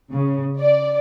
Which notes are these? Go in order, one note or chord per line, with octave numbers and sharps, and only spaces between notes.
C#3
D5